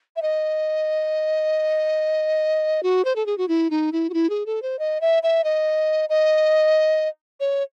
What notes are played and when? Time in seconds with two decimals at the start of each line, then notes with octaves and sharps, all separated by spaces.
0.16 E5
0.22 D#5
2.83 F#4
3.05 C5
3.16 A4
3.26 G#4
3.38 F#4
3.48 E4
3.70 D#4
3.92 E4
4.10 F#4
4.14 E4
4.30 G#4
4.46 A4
4.62 C5
4.79 D#5
5.01 E5
5.23 E5
5.44 D#5
6.09 D#5
7.40 C#5